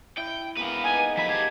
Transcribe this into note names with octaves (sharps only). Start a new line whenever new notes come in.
E4 G5
A#3 B3 G#4 B4 F5
D#4 D#5 F#5 G#5
F3 A4 A#4 B5 B6
G4 F5 G#6